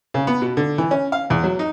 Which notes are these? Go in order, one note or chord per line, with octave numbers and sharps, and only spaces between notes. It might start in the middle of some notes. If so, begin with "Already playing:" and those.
C#3
B3
B2
D3
E3
C#4
F5
E2
F#3
D#4